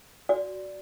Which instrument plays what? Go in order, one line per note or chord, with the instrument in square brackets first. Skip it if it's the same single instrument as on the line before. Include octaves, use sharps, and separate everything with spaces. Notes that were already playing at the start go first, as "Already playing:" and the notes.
[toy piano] F#4 D5